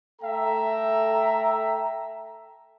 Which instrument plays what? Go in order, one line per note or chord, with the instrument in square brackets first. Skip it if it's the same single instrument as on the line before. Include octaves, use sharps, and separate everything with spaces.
[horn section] A3 A4 E5 G5 A#5